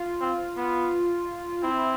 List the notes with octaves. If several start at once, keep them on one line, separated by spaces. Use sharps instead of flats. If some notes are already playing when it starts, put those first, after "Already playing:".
Already playing: F4
C4
B3
C4 E4